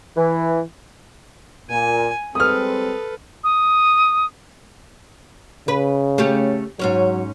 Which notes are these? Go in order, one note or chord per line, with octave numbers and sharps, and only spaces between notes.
E3
A#2 G#5
G3 G#3 C4 A4 B4 D#6 F6
D#6
C#3 B4
A3 C#4 G4
G#2 F#3 C#4 C#5